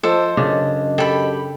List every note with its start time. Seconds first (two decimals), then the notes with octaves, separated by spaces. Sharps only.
0.03 F3 A4 C5 D#5 D6
0.37 F#2 C#3 D4
0.98 G4 A4 B5